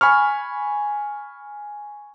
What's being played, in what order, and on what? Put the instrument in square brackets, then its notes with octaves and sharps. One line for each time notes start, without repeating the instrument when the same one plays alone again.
[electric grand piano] G#5 B5 C#6 F6